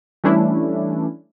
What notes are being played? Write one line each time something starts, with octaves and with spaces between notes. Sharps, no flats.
E3 G3 A3 C#4 D4 E4